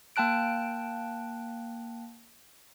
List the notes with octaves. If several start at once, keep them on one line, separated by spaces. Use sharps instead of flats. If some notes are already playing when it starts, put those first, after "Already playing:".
A#3 G5 A5 F#6 D7